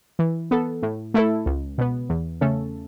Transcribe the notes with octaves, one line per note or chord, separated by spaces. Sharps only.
E3
B3 A4
A2
A3 E4 A4
C#2
B2 B3
E2
C#3 A3 C#4 A4